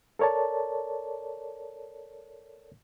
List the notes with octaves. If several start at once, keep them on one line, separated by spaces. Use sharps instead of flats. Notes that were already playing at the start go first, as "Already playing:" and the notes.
A4 A#4 C#5 D5 A5